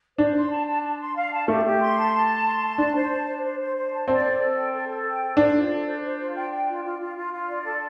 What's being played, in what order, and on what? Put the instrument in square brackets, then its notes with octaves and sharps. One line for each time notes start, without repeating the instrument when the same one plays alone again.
[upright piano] D4 [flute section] C5
[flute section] C6
A5
A5
A5
C6
F5
A5
[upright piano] A3 [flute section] G4
[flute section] G4
C6
A5
A5
C6
C6
A5
[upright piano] D4 [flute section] A5
[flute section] C5
A5
C5
C5
C5
C5
A5
[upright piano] C4 [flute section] D5
[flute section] A4
A4
G5
A4
A4
G5
A4
[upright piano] D4 [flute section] C5
[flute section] F4
A4
C5
C5
F4
G5
G5
F4
F4
F4
F4
F4
D5
A4